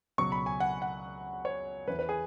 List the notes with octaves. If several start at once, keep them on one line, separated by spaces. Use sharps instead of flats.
C#2 B2 F#3 C#6
B5
G#5
F#5
F#5
C#5
E2 E3 B4
B4
G#4